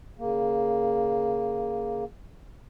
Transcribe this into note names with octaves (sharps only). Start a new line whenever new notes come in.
C#3 A#3